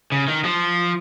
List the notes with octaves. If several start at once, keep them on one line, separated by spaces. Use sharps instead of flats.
C#3
D#3
F3